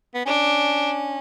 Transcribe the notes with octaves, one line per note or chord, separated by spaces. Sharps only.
B3
C#4 D4